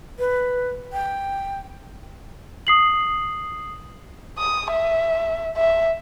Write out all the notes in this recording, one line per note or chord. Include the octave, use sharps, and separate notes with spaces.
B4
G5
D#6 C7 F#7
D#6
E5
E5